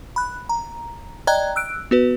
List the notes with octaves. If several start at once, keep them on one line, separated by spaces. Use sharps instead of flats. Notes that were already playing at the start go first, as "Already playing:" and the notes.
B5 F#6
A#5
D5 D#5 G5 A#5 F#6 G#6
E6 F#6 D7
B3 F#4 B4